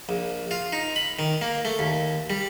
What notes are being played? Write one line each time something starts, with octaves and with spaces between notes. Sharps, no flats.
A#1
F4
D#4
B5
D#3
A#3
A3
D#2
G3